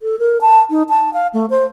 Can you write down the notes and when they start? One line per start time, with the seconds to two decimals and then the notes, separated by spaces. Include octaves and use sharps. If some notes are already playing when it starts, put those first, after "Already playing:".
0.01 A4
0.19 A#4
0.41 A5
0.70 D#4
0.89 A5
1.13 F5
1.34 A3
1.50 C5